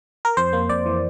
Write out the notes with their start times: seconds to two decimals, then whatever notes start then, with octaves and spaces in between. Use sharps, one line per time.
0.25 A#4
0.37 F2 C5
0.53 A#3
0.69 F2 D5
0.86 E3